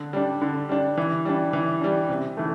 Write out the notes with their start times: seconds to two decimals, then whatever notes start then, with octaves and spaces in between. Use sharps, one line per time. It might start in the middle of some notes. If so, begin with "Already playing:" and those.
Already playing: D3
0.13 G3 D4
0.41 D3
0.69 G3 D4
0.97 E3
1.25 G3 D4
1.53 E3
1.81 G3 D4
2.09 C3
2.37 E3 A3